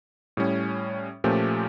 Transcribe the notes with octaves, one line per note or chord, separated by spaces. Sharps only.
A2 G3 C#4
A#2 F3 A3 C#4 G4